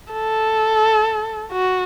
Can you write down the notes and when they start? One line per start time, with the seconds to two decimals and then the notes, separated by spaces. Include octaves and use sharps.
0.13 A4
1.52 F#4